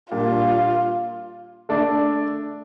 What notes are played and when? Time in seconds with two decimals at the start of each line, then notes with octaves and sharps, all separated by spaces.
0.11 A#2 G3 A#3 D4 F4
1.69 A3 D4 A4 D5